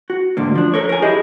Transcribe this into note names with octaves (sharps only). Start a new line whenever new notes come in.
F#4
D2 G#2 D3 A#3
F3 D4
A4 A#4 C#5
A#4 G#5
E4 G4 G#4 D#5